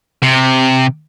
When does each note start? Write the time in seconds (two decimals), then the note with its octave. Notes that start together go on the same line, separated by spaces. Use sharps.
0.22 C3